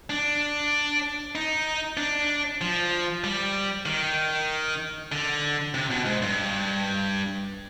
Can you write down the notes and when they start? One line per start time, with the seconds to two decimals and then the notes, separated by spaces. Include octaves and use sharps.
0.10 D4
1.35 D#4
1.97 D4
2.61 F3
3.24 G3
3.86 D#3
5.12 D3
5.74 C3
5.90 B2
6.05 G#2
6.22 G2